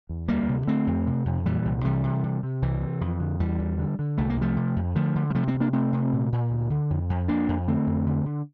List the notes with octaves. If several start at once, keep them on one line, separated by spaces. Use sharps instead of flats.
E2
D2 G3 A#3
C3
D3 A3 C4
F2
C3
F2
A#2 E3 G3
C2
C3 E3 G3
C3
C3
C3
C2 E3
C3
F2
D3
E2 E3 G3
E2
D3
D3
C2 A3
A#3
C3 F3 A3
C3
F2
D3 F3 A3
D3
G3
C3 F3 A3
A3 C4
D2
A#3 D4
C3 A3 C4
C3
A#2
A#2
D2
D3
F2
F2
F2 A#3 D4
F2
D3 A3 C4
F2
D3
D3